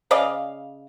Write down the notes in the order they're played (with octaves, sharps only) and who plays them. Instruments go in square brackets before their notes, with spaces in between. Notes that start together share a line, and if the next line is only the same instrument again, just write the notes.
[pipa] C#3 D5 D#5 F5